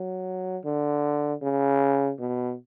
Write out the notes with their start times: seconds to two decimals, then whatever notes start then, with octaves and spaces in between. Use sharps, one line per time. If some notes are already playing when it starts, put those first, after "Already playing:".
Already playing: F#3
0.65 D3
1.42 C#3
2.19 B2